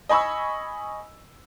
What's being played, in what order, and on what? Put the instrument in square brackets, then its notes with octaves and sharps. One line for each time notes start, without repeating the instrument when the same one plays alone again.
[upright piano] D#5 G#5 B5 C#6 E6